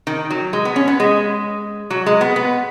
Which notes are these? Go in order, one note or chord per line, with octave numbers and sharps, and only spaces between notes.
D#3
F#3
G#3
B3
C#4
B3
G#3
F#3
G#3
B3
B3